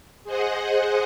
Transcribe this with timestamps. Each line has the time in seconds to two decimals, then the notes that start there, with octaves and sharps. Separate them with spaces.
0.24 G#4 C5 D#5 F#5